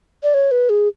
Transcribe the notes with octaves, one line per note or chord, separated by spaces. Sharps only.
D5
C#5
B4
G#4